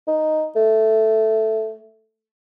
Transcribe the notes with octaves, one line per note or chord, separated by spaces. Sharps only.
D#4
A3